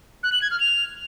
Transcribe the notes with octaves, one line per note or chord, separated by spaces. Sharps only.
F#6
F#7
G#6
F6
F7